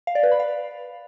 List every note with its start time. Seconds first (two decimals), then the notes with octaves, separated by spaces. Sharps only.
0.07 F5
0.15 D5
0.23 B4
0.31 B5
0.40 F5